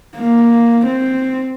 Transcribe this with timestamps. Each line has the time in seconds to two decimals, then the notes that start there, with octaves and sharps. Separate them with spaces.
0.17 A#3
0.86 C4